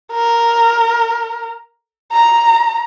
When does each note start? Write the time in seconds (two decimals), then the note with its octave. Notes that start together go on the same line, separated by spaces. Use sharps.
0.13 A#4
2.12 A#5